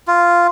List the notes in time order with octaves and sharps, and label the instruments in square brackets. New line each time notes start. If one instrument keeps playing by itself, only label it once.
[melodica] F4